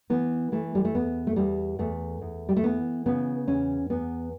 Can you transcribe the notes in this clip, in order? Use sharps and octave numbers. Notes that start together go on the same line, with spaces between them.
E3 B3
E3 A3
G3
A3
E2 B3
A3
E2 G3
E2 A3
E2
G3
A3
E3 B3
C#3 B3
E2 C#4
E2 B3